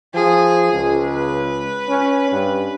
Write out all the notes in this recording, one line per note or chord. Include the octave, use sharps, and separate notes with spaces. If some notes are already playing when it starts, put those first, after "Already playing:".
F3 G#4
C#2
B4
C#4
G2